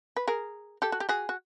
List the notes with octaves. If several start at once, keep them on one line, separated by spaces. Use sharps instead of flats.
B4
G#4 A#4
G4 A4
F#4
G4
F#4 G#4
F#4